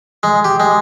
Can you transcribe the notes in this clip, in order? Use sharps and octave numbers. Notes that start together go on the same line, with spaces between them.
G#3
G4
G#3